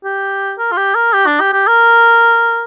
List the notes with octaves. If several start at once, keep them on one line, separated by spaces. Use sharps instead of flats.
G4
A#4
F4
G4
A#4
G4
D4
G4
G4
A#4